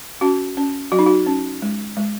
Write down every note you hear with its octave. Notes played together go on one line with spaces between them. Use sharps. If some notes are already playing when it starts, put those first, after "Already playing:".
C#4 F#4
C#4
F#3 F#4
D#4
F#4
C#4
G#3
G#3